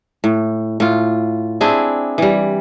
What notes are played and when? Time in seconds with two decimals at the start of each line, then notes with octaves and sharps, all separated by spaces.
0.24 A2
0.80 A2 F4
1.61 C4 D4 E4 G#4
2.18 E3 G3